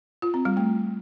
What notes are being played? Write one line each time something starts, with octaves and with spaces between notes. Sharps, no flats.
F4
C4
G3
A3